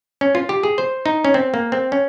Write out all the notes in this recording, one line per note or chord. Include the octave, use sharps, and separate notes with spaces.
C#4
F4
G4
G#4
C5
D#4
C#4
C4
A#3
C4
C#4